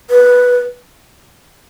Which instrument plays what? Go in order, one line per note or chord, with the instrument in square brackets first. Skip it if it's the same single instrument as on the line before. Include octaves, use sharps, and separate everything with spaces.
[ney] B4